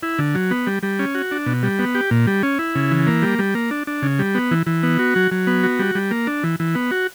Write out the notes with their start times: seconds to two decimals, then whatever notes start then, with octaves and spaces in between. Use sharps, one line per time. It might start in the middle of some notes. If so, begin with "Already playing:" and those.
0.03 E4
0.19 D3
0.35 F#3
0.51 B3
0.67 G3
0.83 G3
0.99 C#4
1.15 F#4
1.31 D4
1.46 B2
1.63 G3
1.79 B3
1.95 G4
2.11 A#2
2.27 G3
2.43 C#4
2.59 E4
2.75 C#3
2.91 E3
3.07 A#3
3.22 G3
3.39 G3
3.55 A#3
3.71 D4
3.87 D4
4.02 C#3
4.19 G3
4.35 B3
4.51 E3
4.67 E3
4.83 B3
4.99 F#4
5.16 F#3
5.31 F#3
5.47 B3
5.63 F#4
5.79 G3
5.95 G3
6.11 A#3
6.27 D4
6.43 E3
6.60 E3
6.75 B3
6.91 F#4